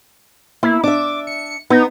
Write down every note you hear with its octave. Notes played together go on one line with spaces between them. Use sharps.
A#3 E4
D4 E5 D6
C#7
B3 D#4